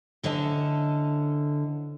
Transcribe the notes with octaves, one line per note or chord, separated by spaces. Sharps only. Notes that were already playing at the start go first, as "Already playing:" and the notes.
D2 D3 E3 C#4 D#5 A5